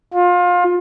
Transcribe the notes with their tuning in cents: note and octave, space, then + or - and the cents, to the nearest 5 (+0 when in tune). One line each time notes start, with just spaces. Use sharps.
F4 +25